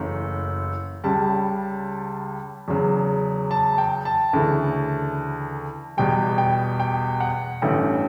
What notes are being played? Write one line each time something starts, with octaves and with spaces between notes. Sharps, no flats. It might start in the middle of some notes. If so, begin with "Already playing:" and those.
Already playing: F#1 F#2 E3 A3
C#2 C#3 G3 A5
E2 C#3 F#3
A5
G5
A5
D2 C#3 E3 A3
E2 B2 G3 G5
G5
G5
F#5
A1 G2 E3 A3 G5